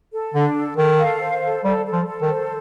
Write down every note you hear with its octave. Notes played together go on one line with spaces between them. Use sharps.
A4
D3 D4
A4
D#3 A4
F5
C5
A4
G3 A4
A4
F3
A4
D#3
C5